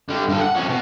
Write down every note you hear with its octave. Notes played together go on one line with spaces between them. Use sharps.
D3 G3
G2 A4
F#5
F2 C#4
B2